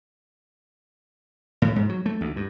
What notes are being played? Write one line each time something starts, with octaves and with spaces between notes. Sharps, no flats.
A2
G#2
F#3
A3
D2
G2